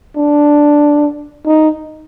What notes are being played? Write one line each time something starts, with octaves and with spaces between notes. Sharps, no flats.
D4
D#4